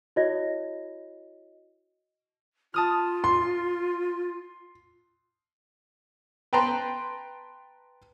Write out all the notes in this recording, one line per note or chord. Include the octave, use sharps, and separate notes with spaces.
E4 F#4 C#5 D#5 A#6
F4 A5 D#6 F6
C6
B4 G5 A5 A#5 C6